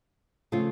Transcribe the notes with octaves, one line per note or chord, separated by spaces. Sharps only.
C#3 F3 A3 C4 F4